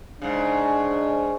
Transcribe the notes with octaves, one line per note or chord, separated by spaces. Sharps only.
G#2 C#3 D4